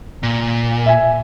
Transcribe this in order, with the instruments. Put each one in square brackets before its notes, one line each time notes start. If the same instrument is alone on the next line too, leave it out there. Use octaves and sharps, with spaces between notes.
[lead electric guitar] A#2
[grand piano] E5 G#5